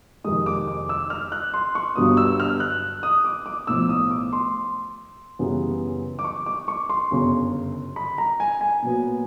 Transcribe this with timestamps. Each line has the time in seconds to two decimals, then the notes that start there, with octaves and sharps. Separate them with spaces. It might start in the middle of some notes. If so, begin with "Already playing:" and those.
0.24 F2 C3 D#3 G#3 D#6
0.46 D6
0.67 D6
0.89 E6
1.10 F6
1.32 F#6
1.54 C6
1.75 C#6
1.96 G1 G2 D3 F#3 B3 D#6
2.17 E6
2.40 F6
2.60 F#6
3.03 D#6
3.25 D6
3.46 D6
3.67 B1 A2 F3 E6
3.89 D#6
4.11 D6
4.33 C6
5.39 F#2 C#3 E3 G3 B3
6.19 D6
6.24 C#6
6.46 D6
6.68 C#6
6.90 C6
7.11 G1 F#2 C#3
7.96 B5
8.18 A#5
8.40 G#5
8.61 G#5
8.82 A#2 F#3 B3